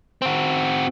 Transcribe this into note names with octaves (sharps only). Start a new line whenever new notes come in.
C4 F#4